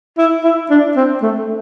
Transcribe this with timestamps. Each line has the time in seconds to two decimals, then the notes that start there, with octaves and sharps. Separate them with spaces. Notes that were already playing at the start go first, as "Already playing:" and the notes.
0.18 E4
0.44 E4
0.70 D4
0.96 C4
1.22 A3